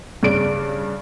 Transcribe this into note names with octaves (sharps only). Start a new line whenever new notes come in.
G2 C#3 D5 D7